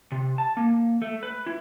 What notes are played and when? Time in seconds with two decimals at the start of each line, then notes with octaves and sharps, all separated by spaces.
0.12 C3
0.38 A5
0.57 A#3
1.02 A3
1.23 B4
1.46 E4